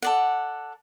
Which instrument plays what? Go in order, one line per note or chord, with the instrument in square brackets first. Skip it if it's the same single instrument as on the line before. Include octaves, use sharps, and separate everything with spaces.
[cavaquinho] A4 D5 F#5